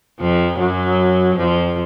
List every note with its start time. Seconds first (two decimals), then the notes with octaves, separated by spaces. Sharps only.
0.20 F2 F3
0.59 F#2 F#3
1.37 F2 F3